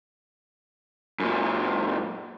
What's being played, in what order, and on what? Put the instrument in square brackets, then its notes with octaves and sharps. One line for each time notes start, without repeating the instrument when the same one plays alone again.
[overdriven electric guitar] F#2 A#2